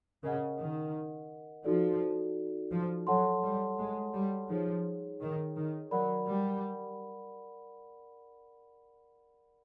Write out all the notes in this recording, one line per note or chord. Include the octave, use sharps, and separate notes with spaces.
C#3 A#4 D#5 F#5
D#3
F3 D#4 F#4 A4 D5
F3
F#3 A4 C#5 F#5 A5 C6
G3
G#3
G3
F3 D#4 G#4 C#5
D#3
D#3
F#3 A#4 D5 F#5 B5
G3